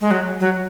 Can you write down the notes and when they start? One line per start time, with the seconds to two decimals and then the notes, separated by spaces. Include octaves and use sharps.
0.01 G#3
0.11 F#3
0.40 F#3